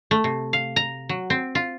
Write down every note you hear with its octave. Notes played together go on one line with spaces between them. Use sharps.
A3
C3
F5
A#5
F#3
C4
F4